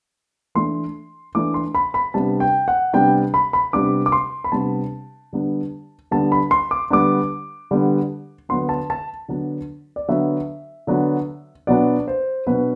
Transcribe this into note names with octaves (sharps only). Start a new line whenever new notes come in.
E3 A3 D4 C6
E3 A3 D4 D6
C6
B5
B5
C3 G3 B3 D4 A5
G5
F#5
C3 G3 B3 D4 G5
B5
B5
C3 G3 B3 D4 D6
D6
C6
B5
C3 G3 B3 D4 A5
D3 G3 B3 D4
D3 G3 B3 D4 A5
B5
C6
D6
D3 G3 B3 D4 D6
D3 G3 B3 D4
D3 F#3 B3 D4 C6
A5
A5
D3 F#3 B3 D4
D5
D3 F#3 B3 D4 E5
D3 F#3 B3 D4
B2 F#3 B3 D4 D5
C5
B2 F#3 B3 D4 B4